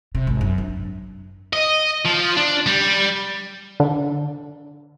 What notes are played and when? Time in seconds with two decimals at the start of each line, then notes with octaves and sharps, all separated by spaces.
0.15 C3
0.27 G#1
0.41 F#2
0.58 D4
1.53 D#5
2.06 F3
2.37 D4
2.66 G3
3.80 D3